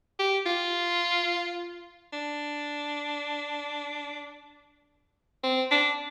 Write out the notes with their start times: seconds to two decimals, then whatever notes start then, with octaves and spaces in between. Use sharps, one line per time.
0.19 G4
0.46 F4
2.13 D4
5.44 C4
5.71 D4